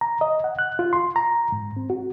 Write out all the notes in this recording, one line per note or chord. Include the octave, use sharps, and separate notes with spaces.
A#5
D#5
F#5
F#6
F4
C6
A#5
G#2
C4
F#4